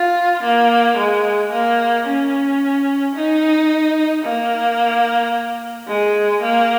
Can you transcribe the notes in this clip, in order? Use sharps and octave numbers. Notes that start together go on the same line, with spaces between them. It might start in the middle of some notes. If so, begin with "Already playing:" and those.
Already playing: F4
A#3
G#3
A#3
C#4
D#4
A#3
G#3
A#3